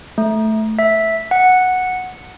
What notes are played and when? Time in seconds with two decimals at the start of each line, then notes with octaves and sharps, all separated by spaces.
0.18 A3
0.79 E5
1.31 F#5